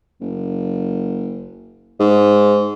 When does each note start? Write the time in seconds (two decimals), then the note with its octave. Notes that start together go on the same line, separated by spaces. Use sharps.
0.21 F#1
2.00 G#2